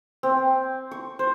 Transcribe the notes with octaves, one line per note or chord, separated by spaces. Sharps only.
C4
C#6
C5